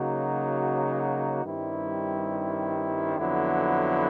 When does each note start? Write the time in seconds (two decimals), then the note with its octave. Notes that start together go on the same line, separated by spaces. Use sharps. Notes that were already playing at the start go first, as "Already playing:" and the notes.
Already playing: C#3 F#3 A#3 D#4 F#4
1.43 G2 D#3 G3 C4 E4
3.17 F2 D3 F#3 B3 E4